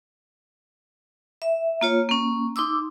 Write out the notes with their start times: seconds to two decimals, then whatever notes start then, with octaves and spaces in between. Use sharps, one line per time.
1.42 E5
1.81 A#3 F4 C#5
2.09 A#3 C#4
2.56 D#4 C6 D6 E6